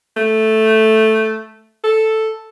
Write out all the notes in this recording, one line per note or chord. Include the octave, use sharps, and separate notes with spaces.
A3
A4